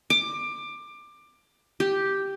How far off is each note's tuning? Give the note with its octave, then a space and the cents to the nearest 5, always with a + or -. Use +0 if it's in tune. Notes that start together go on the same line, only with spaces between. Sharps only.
D6 +20
G4 +0